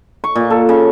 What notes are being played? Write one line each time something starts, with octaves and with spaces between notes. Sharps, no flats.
C#6
A#2
A4
C#3